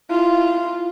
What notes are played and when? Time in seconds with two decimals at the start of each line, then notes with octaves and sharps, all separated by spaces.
0.11 E4 F4